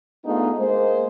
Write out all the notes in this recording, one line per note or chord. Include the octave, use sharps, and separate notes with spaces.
A3 B3 D4 D#4 F4 G#4
G#3 A#3 C5